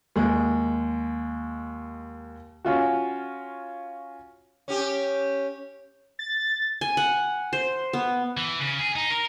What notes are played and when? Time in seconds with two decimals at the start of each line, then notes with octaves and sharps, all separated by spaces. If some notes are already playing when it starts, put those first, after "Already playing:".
0.16 D#2 G#3
2.65 C#4 F4 F#4
4.68 C#4 G4
6.19 A6
6.81 G#5
6.97 F#5
7.53 C5
7.93 B3
8.37 E3
8.60 C#3
8.79 G#4
8.96 D#4
9.10 A#4